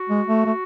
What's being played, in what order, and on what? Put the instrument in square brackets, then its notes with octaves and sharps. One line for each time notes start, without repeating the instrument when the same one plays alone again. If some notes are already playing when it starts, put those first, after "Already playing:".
Already playing: [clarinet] F#4
[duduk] G#3
A3
A3